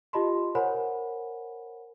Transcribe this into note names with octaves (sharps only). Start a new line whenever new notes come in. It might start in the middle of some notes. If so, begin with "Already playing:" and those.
F4 G4 D#5 A5 B5 C6
A#4 C5 C#5 F#5 G#5 B5